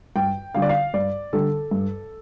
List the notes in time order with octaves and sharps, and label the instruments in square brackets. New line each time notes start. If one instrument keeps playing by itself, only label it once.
[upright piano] G2 G5
D3 G3 F5
D5
F5
G2 D5
D3 G3 A4
G2